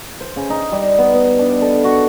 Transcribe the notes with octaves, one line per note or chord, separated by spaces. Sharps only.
C5
C#3
D#4
G3
B3
B3
D4
A4
F#4